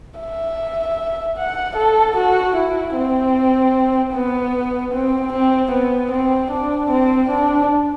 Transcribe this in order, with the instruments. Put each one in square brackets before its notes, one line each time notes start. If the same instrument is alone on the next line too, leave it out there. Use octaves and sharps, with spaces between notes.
[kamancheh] E5
F#5
A4
F#4
E4
C4
B3
C4
C4
B3
C4
D4
C4
D4